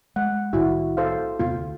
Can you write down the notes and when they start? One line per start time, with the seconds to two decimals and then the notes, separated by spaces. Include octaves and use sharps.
0.16 G#3 F#5
0.53 C2 A2 D#3 E4 F#4
0.97 A4 C5 F5
1.40 E2 C3 B3 F4
1.56 D2